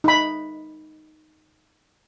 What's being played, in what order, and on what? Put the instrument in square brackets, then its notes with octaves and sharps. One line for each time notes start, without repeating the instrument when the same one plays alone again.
[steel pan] D#4 B5